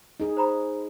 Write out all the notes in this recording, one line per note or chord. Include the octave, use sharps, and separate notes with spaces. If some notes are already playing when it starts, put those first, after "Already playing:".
D#4 G#4
C5 A#5 B5